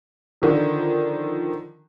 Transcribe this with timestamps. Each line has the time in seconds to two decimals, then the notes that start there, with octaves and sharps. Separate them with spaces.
0.42 D3 D#3 F3